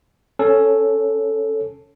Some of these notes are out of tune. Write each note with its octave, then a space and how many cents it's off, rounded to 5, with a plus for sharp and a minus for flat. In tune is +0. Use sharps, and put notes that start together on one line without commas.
C#4 +5 A4 +0 C#5 -15